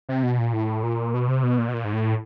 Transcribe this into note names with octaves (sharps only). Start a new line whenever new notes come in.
C3
B2
A#2
A2
A#2
B2
C3
B2
A#2
B2
A#2
G#2
A2